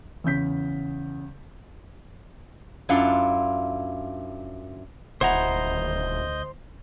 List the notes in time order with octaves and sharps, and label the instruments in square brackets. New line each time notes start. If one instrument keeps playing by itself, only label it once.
[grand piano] E2 C#3 G6 B6
[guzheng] F#2 D4 E4 F4 F#5 C6
[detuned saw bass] D#1 [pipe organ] D2 D#5 G6 [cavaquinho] E4 F#4 [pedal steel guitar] C5 A#5